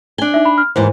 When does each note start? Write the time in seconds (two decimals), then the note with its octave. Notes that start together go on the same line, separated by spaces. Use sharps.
0.18 D4 G#5 G7
0.34 D#4 E5
0.45 B5
0.58 F6
0.76 D#2 G#2 E3 C5